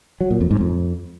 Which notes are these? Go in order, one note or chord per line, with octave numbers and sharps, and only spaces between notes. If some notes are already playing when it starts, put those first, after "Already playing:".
F#3
A#2
F2
G#2
F2